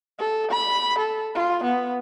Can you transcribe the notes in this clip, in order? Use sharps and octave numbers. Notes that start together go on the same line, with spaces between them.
A4
B5
A4
F4
B3